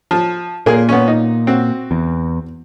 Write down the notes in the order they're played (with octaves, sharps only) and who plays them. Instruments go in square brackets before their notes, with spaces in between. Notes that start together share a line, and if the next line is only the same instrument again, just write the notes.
[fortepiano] F3
[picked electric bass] A#2 [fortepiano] A#3 G#4
[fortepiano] B3 C#4
D#4
C4 F#4
[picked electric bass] E2